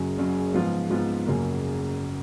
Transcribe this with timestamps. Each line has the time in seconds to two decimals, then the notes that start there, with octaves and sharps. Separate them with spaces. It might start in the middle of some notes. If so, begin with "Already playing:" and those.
Already playing: F#1 F#2 C#3 F#3 C#4
0.18 F#1 F#2 C#3 F#3 C#4
0.54 G#2 F3 B3 F4
0.90 G#2 F3 B3 F4
1.26 F#1 F#2 C#3 F#3 A#3